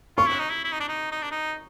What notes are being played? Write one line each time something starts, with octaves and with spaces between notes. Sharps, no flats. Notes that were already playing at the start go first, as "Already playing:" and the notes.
F4 C#6
E4
D#4
E4
E4
D#4
D4
D#4
D#4
D4
D#4